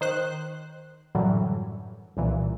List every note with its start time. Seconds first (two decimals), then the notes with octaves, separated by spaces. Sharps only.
0.01 D#3 C5 F#6
1.15 F#2 A2 D3 E3 F#3 G3
2.17 C2 A#2 E3